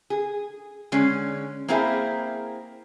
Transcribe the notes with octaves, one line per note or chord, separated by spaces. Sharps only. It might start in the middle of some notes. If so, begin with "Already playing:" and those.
G#4
D3 G#3 C#4
A#3 C4 E4 G#4 A#4